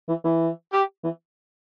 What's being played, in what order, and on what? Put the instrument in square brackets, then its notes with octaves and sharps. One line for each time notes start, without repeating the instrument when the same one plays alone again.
[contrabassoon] E3
E3
[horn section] G4
[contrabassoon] E3